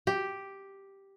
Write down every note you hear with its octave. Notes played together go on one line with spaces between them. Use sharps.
G4